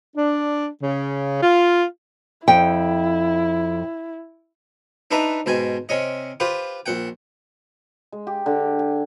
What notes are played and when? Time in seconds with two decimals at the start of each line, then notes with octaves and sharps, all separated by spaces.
0.16 D4
0.83 C#3
1.42 F4
2.48 F2 E4 G5
5.11 D4 D#4 B4 E5 A#5
5.46 G#2 B2 G5 G#5
5.89 C3 C#4 D#5
6.40 F4 G4 B4 C5
6.86 A#1 F#5 G5
8.12 G#3
8.27 G4
8.46 D3
8.79 G#5